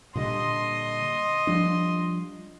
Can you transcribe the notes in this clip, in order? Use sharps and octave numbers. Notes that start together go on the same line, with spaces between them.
A#2 D3 G3 D#5 C6
F3 G3 D4